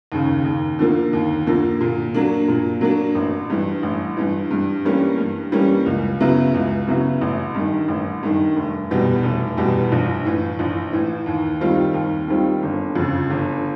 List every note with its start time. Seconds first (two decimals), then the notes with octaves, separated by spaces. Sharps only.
0.12 D#2 C#3
0.45 D#2
0.79 D3 F3 A#3
1.13 D#2
1.47 D3 F3 A#3
1.81 A#2
2.14 F#3 A#3 D4
2.48 A#2
2.81 F#3 A#3 D4
3.15 A1
3.50 G2 E3
3.83 A1
4.17 G2 E3
4.51 G2
4.85 E3 G3 A#3 C#4
5.18 G2
5.52 E3 G3 A#3 C#4
5.86 C#2
6.20 C#3 F#3 B3 E4
6.54 C#2
6.87 C#3 F#3 B3 E4
7.21 A1
7.54 G2 D#3
7.88 A1
8.23 G2 D#3
8.56 F1
8.91 E2 B2 G3
9.23 F1
9.57 E2 B2 G3
9.92 A#1
10.25 A2 E3
10.59 A#1
10.93 A2 E3
11.26 D#2
11.60 D#3 G3 C4 F4
11.94 D#2
12.28 D#3 G3 C4 F4
12.63 G1
12.95 F2 C#3
13.30 G1